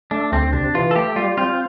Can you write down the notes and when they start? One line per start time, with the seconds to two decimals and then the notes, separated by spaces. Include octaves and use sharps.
0.11 A3 D4
0.32 D2 C4
0.53 C3 D4
0.75 E3 F4
0.91 A4
0.96 A3 G4
1.16 G3 F4
1.37 C4 F4